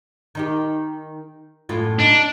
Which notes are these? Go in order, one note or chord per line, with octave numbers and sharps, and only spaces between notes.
D#3 D#4 G4
F#2 A2 F4
D4 D#4